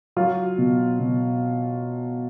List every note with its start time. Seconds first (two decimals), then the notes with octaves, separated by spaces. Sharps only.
0.17 F#3 F4
0.58 B2
0.99 B2